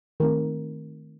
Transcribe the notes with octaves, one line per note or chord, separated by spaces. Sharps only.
D#3 A3 C4 A#4